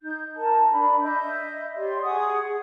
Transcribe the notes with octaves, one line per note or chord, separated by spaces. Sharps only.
D#4 G6
A#4 A5
D4 B5
D#5 E5 G6
G4 C#5 D5 C6
G#4 F#5 C#6 D#6